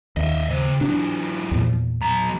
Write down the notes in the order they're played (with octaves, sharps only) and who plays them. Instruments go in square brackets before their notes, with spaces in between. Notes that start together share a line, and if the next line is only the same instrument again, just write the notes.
[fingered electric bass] D#2 [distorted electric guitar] D#5 E5
[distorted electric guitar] C#3 C5
[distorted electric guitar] E3 F#3 [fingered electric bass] D4
[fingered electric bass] E2 A#2
[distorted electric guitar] B1 A#5